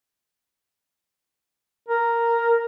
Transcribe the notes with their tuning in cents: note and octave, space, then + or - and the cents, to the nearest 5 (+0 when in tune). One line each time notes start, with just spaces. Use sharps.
A#4 +0